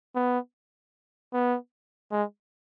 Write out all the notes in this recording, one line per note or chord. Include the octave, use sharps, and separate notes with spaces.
B3
B3
G#3